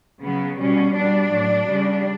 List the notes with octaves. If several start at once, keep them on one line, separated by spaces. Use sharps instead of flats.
C#3 F#3 B3
B2 G3 C#4
B2 G3 D4
A2 F#3
C#3 G3